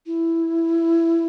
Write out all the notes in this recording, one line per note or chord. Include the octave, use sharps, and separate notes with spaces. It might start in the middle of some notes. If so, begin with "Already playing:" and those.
E4